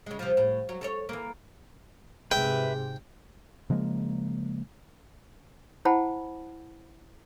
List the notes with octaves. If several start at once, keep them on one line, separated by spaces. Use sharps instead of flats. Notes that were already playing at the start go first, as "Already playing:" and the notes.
C#3 G#3
C3 F3
A2
F#3
A4 A#4 C#5
E3 A#3
G#2 C3 G#4 B4 E5 G5
C#3 F3 G#3 A#3
E4 C5 F#5 G5 A5 B5